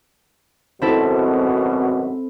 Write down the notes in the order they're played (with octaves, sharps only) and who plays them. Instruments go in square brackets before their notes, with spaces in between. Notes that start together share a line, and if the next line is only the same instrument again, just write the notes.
[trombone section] G#1 F#2 B2 [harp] C4 E4 A4